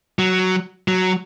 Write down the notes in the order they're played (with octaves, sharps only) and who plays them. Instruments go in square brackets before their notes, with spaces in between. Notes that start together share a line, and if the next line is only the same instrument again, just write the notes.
[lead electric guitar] F#3
F#3